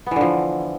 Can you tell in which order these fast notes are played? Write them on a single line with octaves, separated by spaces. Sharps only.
B3 E3 D3 F3